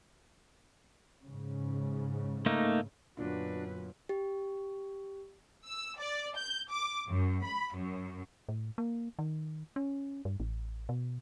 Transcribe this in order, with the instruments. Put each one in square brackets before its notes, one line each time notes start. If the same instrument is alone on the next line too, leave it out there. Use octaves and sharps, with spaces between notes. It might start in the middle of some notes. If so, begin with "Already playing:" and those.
[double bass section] G#2 C#3
[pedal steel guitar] A3 A#3 D#4
[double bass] F#2 [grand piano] A#2 D3 B3 [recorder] D4 [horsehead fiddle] F#4 B4
[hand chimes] G4
[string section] E6
D5
G6
D6
F#2
B5
F#2
[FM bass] A2
A#3
D#3
C#4
G2
A1
B2